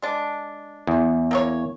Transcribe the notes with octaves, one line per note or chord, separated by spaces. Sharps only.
G#3 D4
E2
A#3 G#4 C#5